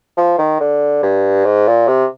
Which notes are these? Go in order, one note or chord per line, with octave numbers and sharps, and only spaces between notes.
F3
D#3
D3
G2
G#2
A#2
C3